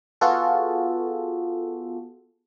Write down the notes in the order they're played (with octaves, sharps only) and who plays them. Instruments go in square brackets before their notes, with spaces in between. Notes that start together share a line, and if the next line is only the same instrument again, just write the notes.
[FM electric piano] B3 F4 F#4 G#4 A4